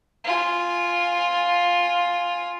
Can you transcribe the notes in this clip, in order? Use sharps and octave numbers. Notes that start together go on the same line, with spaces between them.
F4 G#5